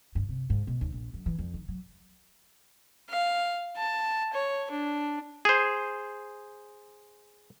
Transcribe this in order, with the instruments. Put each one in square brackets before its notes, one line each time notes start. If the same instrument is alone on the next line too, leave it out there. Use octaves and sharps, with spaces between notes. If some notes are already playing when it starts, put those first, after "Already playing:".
[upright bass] G2
C3
G#2
B2
D#2
A#1
F#2
E3
F2
D#3
F#3
[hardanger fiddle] F5
A5
C#5
D4
[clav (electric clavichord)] G#4 C5